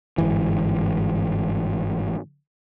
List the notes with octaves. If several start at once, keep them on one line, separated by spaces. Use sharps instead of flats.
G1 G#2 E3